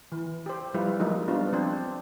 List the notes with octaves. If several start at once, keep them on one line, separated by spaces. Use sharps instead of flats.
E3
G4 C5
F3 G3 E4 F4 B4
F3 F#3 G#3 A#3 D#4
G3 B3 D4 F4
F3 C4 D4 C5